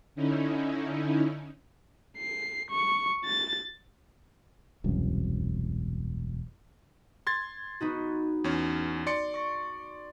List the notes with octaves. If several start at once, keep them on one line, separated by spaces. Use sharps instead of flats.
D3 C#4 D#4 E4
C7
C#6
A6
E1 C2 F#2
C6 G#6 A6
B3 D#4 F#4
E2 C#4
D5 C6 C#7
C#6 A#6